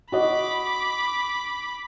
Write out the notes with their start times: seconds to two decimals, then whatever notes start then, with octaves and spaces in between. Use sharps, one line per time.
0.12 F#4 D#5 B5 D6